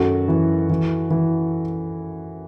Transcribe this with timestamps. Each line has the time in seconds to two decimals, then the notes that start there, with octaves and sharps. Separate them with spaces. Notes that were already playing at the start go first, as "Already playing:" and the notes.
Already playing: F#2 D#3 F#4 A4
0.28 E3
0.70 E3
1.10 E3